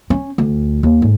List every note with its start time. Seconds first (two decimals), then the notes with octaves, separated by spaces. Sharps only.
0.10 C#4
0.38 D2
0.83 D#2
1.02 G#2